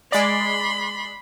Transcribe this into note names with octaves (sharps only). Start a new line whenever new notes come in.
G#3 D5 B5 C6